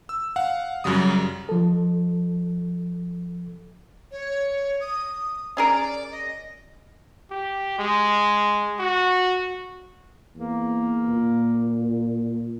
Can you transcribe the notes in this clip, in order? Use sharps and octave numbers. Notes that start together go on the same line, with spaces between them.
E6
F5 F#5
F#2 C#3 F#3 G3 D#6
F3 A4
C#5
D#6
C#4 G#4 A#4 D5
D#5
G4
G#3
F#4
E2 A#3
A#2